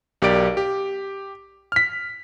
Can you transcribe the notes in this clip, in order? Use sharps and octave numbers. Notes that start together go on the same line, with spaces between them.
B1 G4 A#4 D5 D7
G4
F6 B6